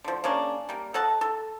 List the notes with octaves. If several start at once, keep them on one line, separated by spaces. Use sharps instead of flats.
D3 F3
C#3 A#3 C#4 D4
G3 A#3
A4 D#5 F#5 A5
A4